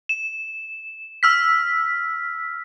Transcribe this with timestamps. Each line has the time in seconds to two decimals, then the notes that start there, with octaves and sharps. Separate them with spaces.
0.09 E7
1.23 E6 F6 B6